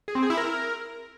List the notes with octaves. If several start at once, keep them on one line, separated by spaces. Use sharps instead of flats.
G#4
C4
G#4
E4
A#4